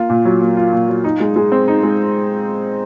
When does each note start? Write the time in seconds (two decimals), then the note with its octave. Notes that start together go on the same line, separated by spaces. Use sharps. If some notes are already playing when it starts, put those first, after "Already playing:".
Already playing: A#3 F4
0.10 A#2
0.25 F#3
0.41 A#3
0.57 F4
0.73 A#2
0.88 F#3
1.04 D#4
1.20 G#3
1.36 G#3
1.52 C4
1.68 D#4
1.83 G#3